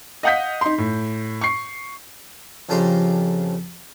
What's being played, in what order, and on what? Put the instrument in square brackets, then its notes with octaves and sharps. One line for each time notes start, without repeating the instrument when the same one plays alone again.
[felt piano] D#5 F5 F#5 D#6 G6 B6
D#4 C6
A2
C#6 C7
[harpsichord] F2 C#3 D4 G4 A#5 C6